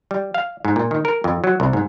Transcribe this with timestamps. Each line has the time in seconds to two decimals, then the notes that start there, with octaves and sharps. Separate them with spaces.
0.11 G3
0.34 F5
0.65 G#2
0.76 A#2
0.91 D#3
1.05 A#4
1.24 F2
1.44 F#3
1.60 C2
1.73 G#2